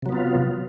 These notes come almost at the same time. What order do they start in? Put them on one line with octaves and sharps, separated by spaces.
C3 F#3 B3 F4